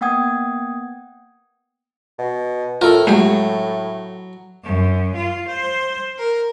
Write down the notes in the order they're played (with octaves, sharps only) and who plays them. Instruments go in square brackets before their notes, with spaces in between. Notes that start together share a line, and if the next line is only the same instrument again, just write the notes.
[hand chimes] A#3 B3 F#5 G5 D#6 G#6
[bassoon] B2
[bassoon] A2 [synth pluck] F4 [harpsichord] A4 A#4
[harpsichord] F#3 [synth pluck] G#3 A3 G4
[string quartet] F#2
F4
C5
A#4